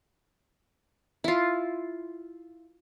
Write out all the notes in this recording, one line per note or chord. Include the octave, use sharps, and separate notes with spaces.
E4 F4